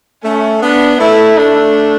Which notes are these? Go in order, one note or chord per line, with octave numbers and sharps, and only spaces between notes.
A3 C#4
B3 D4
A3 E4
A3 D4